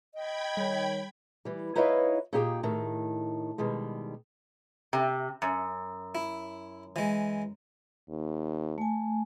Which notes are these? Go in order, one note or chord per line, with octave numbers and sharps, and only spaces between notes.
D#5 G5 B5 G#6
D#3 G3 C#5
E3 G3
D#4 E4 B4 C#5 D#5 F5
A#2 D#4 G4 G#4 G5
A2 D#3
B2 D#3 G3 G#3
C3
F#2
E4
E3 G#3
D#2
A3 G#5